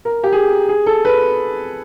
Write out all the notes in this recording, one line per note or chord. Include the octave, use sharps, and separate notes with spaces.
A#4
G4
G#4
G#4
A4
B4